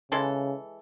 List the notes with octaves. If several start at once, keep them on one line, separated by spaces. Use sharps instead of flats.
C#3 E3 G#3 A4